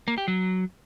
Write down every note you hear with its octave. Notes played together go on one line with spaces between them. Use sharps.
A#3
G4
F#3